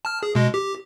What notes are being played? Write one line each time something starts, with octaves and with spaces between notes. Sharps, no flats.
A5 F6
G#4
B2 G#3
G4